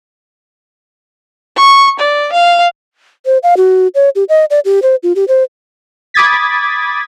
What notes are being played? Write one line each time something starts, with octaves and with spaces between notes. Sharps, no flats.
C#6
D5
F5
C5
F5
F#4
C#5
G4
D#5
D5
G4
C5
F4
G4
C5
B5 D6 D#6 G#6 A6 B6